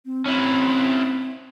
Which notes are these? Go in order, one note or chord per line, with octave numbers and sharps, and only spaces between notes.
C4
C4 C#4 E4